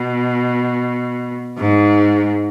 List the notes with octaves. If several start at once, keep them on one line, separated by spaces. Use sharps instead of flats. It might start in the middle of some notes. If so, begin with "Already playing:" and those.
Already playing: B2
G#2